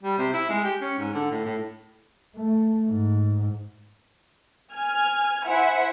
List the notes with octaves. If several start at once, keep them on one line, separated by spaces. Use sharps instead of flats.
G3
C3
E4
G#3
G4
C#4
G#2
D3
A2
A2
A3
G#2
G#5 F6 G#6
E4 C5 E5 F#5 G#5